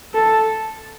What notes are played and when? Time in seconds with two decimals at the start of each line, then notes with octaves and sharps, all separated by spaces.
0.14 A4